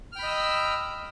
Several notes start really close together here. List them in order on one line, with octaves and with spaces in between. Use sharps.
F6 G5 B5 D#5 E6